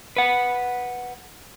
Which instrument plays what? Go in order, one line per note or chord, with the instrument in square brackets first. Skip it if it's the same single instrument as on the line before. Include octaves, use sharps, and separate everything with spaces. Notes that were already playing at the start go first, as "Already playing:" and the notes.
[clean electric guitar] B4 F#5